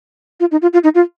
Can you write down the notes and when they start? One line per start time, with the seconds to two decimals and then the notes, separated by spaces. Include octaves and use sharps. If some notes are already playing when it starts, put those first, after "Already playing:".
0.40 F4
0.52 D#4
0.62 F4
0.73 F4
0.84 D#4
0.95 F4